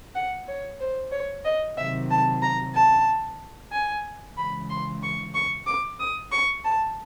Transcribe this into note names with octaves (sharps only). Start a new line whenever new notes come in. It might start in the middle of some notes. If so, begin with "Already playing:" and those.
F#5
C#5
C5
C#5
D#5
C3 D#3 F#3 E5
A5
A#5
A5
G#5
C#3 E3 G#3 B5
C6
C#6
C#6
D6
D#6
C#6
A5